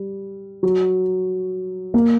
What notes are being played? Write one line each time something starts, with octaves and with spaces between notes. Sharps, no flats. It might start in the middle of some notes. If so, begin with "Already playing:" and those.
Already playing: G3
F#3
A#3